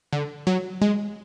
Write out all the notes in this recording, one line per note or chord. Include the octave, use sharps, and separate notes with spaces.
D3
F#3
G#3